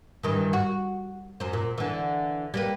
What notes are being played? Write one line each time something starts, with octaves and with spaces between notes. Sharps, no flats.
G2 D#3 E3
F#4
F#2 C5
A#2
D3 E3
G3 A#3 B4